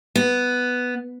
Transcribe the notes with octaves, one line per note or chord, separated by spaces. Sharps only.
B3